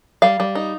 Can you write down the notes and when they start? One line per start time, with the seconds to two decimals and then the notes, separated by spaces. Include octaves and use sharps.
0.22 G3 F5
0.40 G3
0.55 D#4